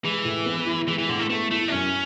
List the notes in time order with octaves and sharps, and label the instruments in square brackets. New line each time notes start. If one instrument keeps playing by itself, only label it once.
[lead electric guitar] E3 [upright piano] G#3
[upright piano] A2
B3
E4
[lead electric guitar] E3 [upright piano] G#3
[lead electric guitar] E3
[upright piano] A2 [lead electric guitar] D3
[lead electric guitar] A3
[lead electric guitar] A3 [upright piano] B3
[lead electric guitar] A3 [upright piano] E4
[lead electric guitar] D4
[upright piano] F#2 [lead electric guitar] C#4